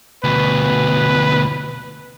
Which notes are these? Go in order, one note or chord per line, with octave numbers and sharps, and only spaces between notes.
D2 B2 B4